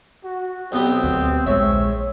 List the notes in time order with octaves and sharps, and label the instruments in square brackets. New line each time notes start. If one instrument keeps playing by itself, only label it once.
[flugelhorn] F#4
[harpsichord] B1 B3 G4 [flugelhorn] C4
[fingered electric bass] D2
[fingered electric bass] A#1 G#3 [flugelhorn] C#5 [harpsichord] E5